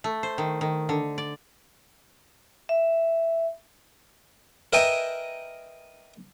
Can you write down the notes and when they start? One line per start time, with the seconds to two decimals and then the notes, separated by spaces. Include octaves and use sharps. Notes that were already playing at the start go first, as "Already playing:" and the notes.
0.04 A3
0.23 C5
0.38 D#3
0.61 D#3
0.89 D3
1.18 D5
2.69 E5
4.73 A#4 B4 D#5 E5 G5 G#5